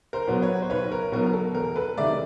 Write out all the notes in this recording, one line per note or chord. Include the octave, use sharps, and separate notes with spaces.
A#4 C5
B2 F#3 B3
B4 C#5
C5
B1 B4 C#5
A#4
B2 F#3 B3 A#4
A#4
A4
E2 A#4
A4 B4
C3 D#3 G#3 D5 E5